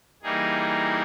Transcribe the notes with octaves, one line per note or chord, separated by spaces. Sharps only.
E3 G3 A#3 D#4 G#4